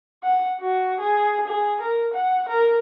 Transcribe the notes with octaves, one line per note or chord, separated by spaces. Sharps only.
F#5
F#4
G#4
G#4
A#4
F#5
A#4